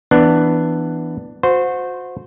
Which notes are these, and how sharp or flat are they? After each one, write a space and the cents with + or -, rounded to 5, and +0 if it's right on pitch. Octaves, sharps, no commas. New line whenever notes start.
E3 +0 B3 +0 D4 +10
F#4 -30 C5 -15